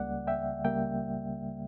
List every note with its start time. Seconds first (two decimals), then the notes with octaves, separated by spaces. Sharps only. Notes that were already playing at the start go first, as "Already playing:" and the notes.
Already playing: C#2 C#3 G3 A#3 D5 F#5
0.27 E5 G5
0.65 C#3 G3 A#3 E5 G5